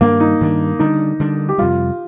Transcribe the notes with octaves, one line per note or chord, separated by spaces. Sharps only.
G2 D#3 G3 A#3 D4
D#4
G2 D#3 G3 D4
D3 G3 D4 D#4
D3 G3 D4
G4
F2 C3 G3 F4